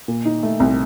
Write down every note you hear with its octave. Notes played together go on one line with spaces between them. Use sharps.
A#2
D#4
A3
C2